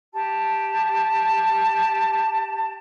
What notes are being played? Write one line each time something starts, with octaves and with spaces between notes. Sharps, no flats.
G4 A5